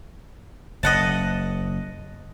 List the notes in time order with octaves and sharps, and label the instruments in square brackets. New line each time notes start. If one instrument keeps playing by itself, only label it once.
[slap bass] F#1 [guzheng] D#5 F#5 A5